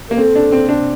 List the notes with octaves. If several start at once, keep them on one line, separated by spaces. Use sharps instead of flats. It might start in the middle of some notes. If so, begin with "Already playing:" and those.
A#3 A#4
C4 A4
D4
C4
D4